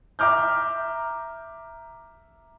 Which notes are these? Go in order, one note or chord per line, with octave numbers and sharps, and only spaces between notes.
E5 A#5 D6 F6 G6